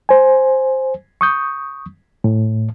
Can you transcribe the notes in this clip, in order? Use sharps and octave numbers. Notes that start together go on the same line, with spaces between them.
C5 G#5
C#6 D#6 G6
A2